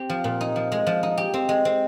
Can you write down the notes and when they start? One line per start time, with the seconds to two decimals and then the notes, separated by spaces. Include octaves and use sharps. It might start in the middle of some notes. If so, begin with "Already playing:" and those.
Already playing: C4 G4
0.09 F3
0.24 A#2
0.41 D#4
0.56 F3
0.72 G#3
0.87 F3
1.03 D#4
1.17 G4
1.34 C4
1.49 G#3
1.65 C4